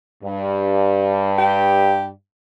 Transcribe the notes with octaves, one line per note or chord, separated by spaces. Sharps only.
G2
G4